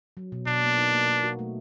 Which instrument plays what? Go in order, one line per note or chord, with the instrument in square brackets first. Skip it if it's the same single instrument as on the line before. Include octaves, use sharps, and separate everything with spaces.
[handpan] F#3
B2
[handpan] B2 [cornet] D4
[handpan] A#3
D#4
A#3
A#3
F#4
A3